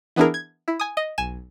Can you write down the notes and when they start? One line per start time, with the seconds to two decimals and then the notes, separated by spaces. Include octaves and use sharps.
0.16 E3 B3 D4 E4 G#4 A#4
0.34 G#6
0.68 E4
0.80 G#5 D#6
0.97 D#5
1.18 B1 G#5 E7